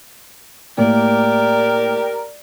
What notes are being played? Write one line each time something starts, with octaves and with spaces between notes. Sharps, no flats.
A2 A#3 G4 A#4 D5